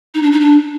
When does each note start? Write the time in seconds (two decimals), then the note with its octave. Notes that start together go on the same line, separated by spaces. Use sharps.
0.15 D#4
0.23 D4
0.32 D#4
0.41 D4